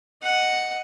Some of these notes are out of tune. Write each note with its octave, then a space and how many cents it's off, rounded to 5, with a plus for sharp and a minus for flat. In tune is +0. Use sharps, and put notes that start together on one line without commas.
D#5 +0 F#5 +0